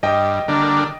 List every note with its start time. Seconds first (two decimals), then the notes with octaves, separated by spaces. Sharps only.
0.03 G2 D#5 G5
0.48 D3 G3 A#3 D4